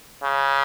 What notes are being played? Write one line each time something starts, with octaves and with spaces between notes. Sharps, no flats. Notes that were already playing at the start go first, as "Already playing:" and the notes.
C#3